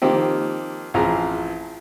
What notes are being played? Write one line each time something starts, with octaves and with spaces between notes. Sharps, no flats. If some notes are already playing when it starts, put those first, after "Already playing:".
D#3 F3 A#3 C4 G4
A1 F3 C4 G#4 A#5